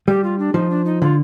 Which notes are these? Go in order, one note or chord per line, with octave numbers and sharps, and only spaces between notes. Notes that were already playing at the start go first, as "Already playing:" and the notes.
G3 G4
F4
D4
F3 D#4
D4
D#4
D3 F4